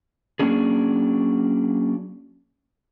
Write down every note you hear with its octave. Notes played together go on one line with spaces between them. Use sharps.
F#3 A#3 C#4 D4 G#4